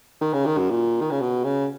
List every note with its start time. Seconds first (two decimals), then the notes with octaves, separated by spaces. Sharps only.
0.21 D#3
0.33 C#3
0.46 D#3
0.58 F#2
0.70 A#2
1.01 D#3
1.11 C#3
1.20 B2
1.44 C#3